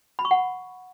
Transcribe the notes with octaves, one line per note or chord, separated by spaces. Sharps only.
B5
C#6
F#5